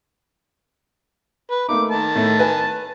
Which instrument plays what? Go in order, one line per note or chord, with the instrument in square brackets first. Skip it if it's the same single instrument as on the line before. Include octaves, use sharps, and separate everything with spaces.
[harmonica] B4
[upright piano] A3 A#3 D#4 [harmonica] D6
[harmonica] D#3 A5
[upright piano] A2 A3
B4 G#5